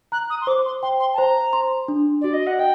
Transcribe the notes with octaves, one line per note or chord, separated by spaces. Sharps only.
A#5 F#6
D#6
C6
C5 D6
C6
G5 C6
C6
A5
C5 A#5
C6
D4
F#4 D5
D#5
F#5
D#5 G5